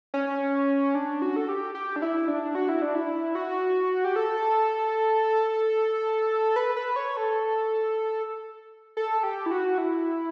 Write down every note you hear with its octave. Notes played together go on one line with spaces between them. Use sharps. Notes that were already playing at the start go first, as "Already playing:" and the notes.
C#4
D4
F#4
A4
G4
G4
D4
E4
D4
F#4
E4
D4
E4
F#4
G4
A4
B4
B4
C#5
A4
A4
G4
E4
F#4
E4